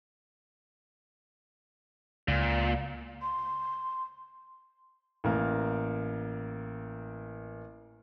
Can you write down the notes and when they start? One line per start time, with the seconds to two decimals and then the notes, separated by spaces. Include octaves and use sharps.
2.28 C#2 A#2
3.22 C6
5.24 A1 A#3 A#4